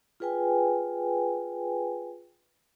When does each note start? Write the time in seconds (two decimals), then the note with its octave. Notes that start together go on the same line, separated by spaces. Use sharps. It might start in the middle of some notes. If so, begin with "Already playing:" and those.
0.20 F4 G#4 B4 G5 G#5